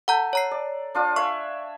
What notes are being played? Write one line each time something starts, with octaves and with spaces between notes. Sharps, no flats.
A4 F#5 A#5 G6
C#5 A#5 C7
D5
D4 F4 D5
E5 F5 G#5 C#6